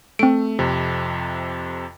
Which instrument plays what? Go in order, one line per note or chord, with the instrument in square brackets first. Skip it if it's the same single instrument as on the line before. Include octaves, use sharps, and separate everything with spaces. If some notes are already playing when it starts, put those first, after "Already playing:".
[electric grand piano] A3 [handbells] C4 D7
[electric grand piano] F2 C3